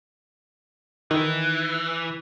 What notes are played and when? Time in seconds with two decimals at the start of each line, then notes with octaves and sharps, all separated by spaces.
1.11 D#3 E3